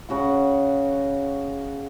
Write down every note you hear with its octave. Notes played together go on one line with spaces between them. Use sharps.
C#3 F#4 F#5